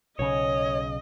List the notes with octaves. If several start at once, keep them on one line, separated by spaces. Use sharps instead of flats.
B1 C#3 C#5 D#5